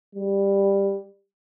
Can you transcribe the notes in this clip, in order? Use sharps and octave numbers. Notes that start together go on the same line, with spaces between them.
G3